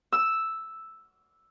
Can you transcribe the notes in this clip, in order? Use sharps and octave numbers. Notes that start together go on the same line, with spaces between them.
E6